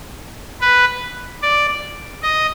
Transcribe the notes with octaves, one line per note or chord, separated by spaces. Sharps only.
B4
D5
D#5